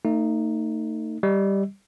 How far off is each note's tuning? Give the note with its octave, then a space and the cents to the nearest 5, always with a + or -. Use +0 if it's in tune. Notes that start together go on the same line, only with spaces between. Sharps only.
A3 +40 D#4 +0
G3 +0 D#5 +10